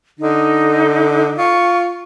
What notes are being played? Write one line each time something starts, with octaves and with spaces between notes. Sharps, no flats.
D3 D#4
F4 C#6